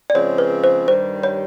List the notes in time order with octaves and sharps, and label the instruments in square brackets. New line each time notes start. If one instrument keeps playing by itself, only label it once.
[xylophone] D5
[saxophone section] C#3 F3 G#3 C4 [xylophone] C#5
[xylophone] B4
C5
[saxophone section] G2 D#3 G3 [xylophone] C5
[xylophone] C#5